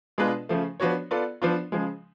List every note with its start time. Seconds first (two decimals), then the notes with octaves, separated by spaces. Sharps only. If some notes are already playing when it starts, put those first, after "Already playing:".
0.18 B2 G#3 D4 F4 B4
0.49 C#3 F3 A3
0.80 F3 B3 D4 F#4 C#5
1.11 B3 F4 A4 D5
1.42 F3 B3 D4 F4
1.72 C#3 F3 G#3